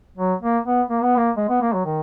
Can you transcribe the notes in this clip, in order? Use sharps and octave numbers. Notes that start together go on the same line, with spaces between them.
F#3
A#3
B3
A#3
B3
A#3
G#3
B3
A#3
F#3
D#3